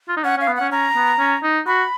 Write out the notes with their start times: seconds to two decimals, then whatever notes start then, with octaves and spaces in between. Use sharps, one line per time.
0.09 F4
0.17 D#4
0.24 C#4 F#5
0.37 C#4
0.41 F5
0.48 B3
0.56 C#4 F#5
0.72 C#4 A#5
0.96 B3
1.19 C#4
1.43 D#4
1.67 F#4 B5